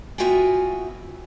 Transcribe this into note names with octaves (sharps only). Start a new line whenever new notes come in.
B3 F4 F#4 E5 G5 G#5